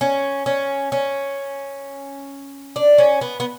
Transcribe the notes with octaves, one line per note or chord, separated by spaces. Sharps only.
C#4
C#4
C#4
D4
C#4
B3
B3